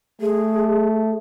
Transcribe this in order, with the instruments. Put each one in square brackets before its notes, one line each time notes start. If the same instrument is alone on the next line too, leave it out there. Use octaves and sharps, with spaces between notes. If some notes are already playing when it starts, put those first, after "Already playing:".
[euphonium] A3 [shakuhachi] G#4